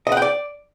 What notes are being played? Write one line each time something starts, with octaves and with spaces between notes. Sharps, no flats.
D#5
F#5
G5
D5